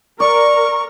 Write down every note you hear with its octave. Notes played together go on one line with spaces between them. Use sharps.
A#4 D5 C#6